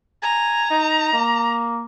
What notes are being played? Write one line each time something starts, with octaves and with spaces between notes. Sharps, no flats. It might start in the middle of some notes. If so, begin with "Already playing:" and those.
G#5 A#5
D#4
A#3